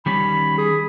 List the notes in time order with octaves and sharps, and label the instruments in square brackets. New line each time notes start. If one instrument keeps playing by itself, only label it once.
[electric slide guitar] D#3 G3 C#4 [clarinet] B5
[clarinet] G#4